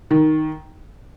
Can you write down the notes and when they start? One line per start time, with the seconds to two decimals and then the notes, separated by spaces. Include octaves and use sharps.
0.11 D#3